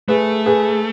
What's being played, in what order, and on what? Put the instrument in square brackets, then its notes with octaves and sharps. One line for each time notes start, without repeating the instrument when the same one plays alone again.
[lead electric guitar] A3 [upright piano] G#4 B4
[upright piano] G#4 B4